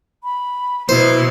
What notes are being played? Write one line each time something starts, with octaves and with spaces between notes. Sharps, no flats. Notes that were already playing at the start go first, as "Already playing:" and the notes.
B5
B2 F#3 E4 C5